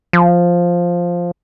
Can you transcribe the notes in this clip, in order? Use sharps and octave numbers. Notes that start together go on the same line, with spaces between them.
F3